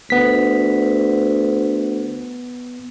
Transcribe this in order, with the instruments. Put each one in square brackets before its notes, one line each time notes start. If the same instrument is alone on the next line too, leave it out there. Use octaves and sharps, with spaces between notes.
[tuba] D2 [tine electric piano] B3 B6